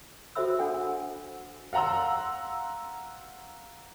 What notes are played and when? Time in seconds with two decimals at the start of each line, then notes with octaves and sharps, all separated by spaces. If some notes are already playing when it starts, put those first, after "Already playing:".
0.35 F#4 A4 C5 E5 B5 E6
0.59 D4 A4 F#5 G#5
1.73 F5 F#5 A#5 C6 E6